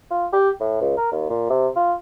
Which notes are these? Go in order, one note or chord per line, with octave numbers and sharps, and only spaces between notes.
F4
G4
A2
C#2
A#4
D#2
A#2
C3
F4